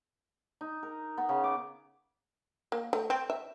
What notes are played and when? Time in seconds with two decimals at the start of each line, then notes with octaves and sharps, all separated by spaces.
0.61 D#4
0.83 A#4
1.18 B3
1.29 C#3
1.44 D6
2.72 A#3
2.93 A3
3.10 C4
3.30 E5